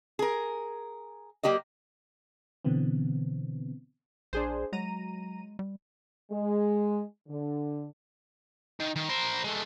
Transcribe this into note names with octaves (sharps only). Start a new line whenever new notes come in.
G#4 A#4
F#3 A#3 G4 D5 D#5
B2 D3 E3 B3 C4
A#1 D4 G#4 C5
F#3 G#3 A#5 D#7
G3
G#3
D3
D#3
D#3
A#4 C5
G#3 A3